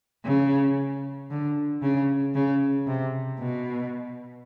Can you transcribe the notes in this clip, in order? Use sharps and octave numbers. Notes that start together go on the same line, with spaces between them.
C#3
D3
C#3
C#3
C3
B2